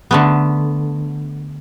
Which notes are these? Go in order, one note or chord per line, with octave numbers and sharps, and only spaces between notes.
D3 A3 B3